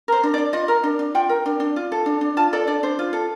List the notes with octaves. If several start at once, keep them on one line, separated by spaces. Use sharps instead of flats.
A#4 C5
D4
D5
D4
F4 D#5
A#4
D4
D4
F4 G5
A#4
D4
D4
F4
A4
D4
D4
F4 A5
A4 D5
D4 D5
D4 C5
F4
A4